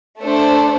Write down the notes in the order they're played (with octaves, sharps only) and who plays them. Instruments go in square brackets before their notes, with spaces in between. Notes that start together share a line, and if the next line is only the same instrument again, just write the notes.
[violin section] A3 D4 A4 C5